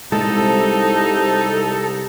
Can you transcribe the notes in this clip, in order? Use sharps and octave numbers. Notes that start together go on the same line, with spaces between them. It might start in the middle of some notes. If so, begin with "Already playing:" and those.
C2 G#3 D#4 A4